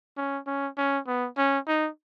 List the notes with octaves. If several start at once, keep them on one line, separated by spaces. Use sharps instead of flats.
C#4
C#4
C#4
B3
C#4
D#4